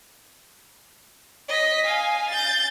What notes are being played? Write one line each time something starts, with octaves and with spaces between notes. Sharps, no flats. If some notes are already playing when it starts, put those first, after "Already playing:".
D#5 B6
F5 G#5
G6 A6